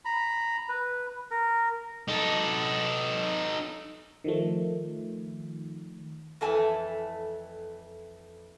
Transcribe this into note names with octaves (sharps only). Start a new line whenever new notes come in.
A#5 B5
B4
A#4
D#4 A4
D#3 F3 A3
F2 E3 A3 A4 G#5